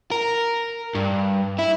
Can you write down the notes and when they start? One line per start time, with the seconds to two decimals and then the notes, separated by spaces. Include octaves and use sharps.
0.12 A#4
0.95 G2
1.59 E4